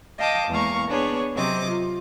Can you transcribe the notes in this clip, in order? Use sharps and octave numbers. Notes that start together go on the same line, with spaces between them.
D#5 F5 G5 A5 D6 D#6
E2 G#3 A#3 F5 A#5 C#6
B3 D4 G#4 C#5
C3 F#3 C4 D#5 D6
F4